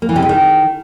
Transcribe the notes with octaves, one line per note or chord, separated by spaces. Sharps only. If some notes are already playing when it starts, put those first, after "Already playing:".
A#3
E3
C3
G#3
D#3